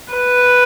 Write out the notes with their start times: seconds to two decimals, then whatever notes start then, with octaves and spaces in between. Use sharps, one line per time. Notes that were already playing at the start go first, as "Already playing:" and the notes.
0.13 B4